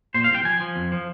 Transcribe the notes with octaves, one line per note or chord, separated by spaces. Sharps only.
A#2 C5
F5
C2 G5
F3 G#5
F3
F2
F3